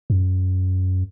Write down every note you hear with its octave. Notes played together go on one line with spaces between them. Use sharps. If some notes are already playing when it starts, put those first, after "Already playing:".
F#2